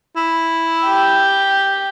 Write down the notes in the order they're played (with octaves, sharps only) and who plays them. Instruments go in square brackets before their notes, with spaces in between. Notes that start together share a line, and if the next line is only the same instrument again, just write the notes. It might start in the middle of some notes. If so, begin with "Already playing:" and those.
[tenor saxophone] E4
[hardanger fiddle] G4